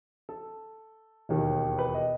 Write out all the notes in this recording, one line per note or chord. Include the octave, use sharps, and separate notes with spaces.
A4
E1 D#2 D#3
B4
D#5